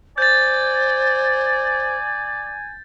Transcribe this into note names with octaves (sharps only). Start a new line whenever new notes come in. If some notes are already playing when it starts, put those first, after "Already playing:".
C5 D5 G#5 G6 A6